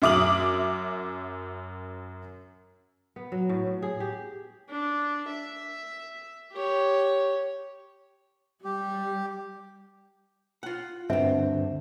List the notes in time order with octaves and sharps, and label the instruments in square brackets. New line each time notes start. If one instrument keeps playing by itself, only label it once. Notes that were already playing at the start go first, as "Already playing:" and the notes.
[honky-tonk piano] F#2 E5 D6 D#6 F#7
[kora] B3
F#3
A2
A2
G#4
G4
[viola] D4
E5
G4 C#5
[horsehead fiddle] G3 [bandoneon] G4
[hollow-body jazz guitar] F4 F#5
[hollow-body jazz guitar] D2 C4 [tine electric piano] G2 D3 [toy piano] E5